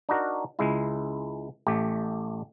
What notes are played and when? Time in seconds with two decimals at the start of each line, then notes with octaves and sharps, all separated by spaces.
0.09 D4 D#4 F#4 A#4
0.59 C#2 G#3 E4
1.67 A1 A3 G4